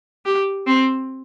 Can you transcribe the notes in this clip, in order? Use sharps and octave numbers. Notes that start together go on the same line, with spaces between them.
G4
C4